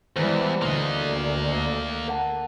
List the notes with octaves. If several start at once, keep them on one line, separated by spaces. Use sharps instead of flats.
E2 E3 G3 G#3 C5
D2 A#3 D#5 C6
A#4 F#5 A5